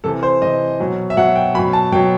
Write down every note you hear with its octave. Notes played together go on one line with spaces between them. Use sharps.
C3 E3 A4
C5
C3 E3 D#5
B2 F#3
E5
B2 F#3 F#5
G5
B2 F#3 B5
A5
B2 F#3 G5